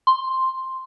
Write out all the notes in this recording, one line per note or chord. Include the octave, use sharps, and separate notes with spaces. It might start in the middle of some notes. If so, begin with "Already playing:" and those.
C6